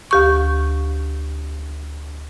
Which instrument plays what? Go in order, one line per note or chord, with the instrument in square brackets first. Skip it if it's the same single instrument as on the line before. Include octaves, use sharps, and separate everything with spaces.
[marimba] D2 G4 C#6